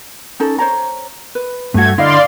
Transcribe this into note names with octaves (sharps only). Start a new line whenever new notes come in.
C#4 D#4 A4
C5 C#5 A#5
B4
G2 A3 F#4 G#6
D3 E4 D5 D#5 F5 C6